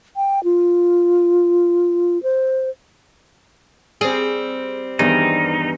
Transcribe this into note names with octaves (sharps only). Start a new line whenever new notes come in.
G5
F4
C5
G3 C4 G#4
E2 G2 D#3 E3 D#4